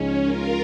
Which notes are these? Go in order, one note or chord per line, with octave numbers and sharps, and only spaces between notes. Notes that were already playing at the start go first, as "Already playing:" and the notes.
Already playing: C#2 C#3 F3 G#3 C#4 D#4
F4 A#4